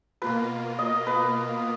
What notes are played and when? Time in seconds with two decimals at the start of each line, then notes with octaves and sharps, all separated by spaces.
0.22 B2 A#3 F4 B4
0.79 D#5
1.07 B4